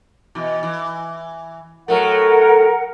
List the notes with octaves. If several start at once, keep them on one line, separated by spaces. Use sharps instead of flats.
B2 E3
E3
A2 F#3 A3 A#4 F#5